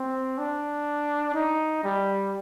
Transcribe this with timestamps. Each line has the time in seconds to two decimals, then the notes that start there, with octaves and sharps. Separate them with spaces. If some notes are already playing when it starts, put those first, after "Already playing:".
Already playing: C4
0.38 D4
1.35 D#4
1.84 G3